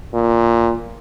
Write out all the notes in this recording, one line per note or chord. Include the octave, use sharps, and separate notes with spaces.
A#2